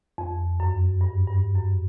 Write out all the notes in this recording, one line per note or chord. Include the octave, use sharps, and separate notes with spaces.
F2
F#2
G2
G2
F#2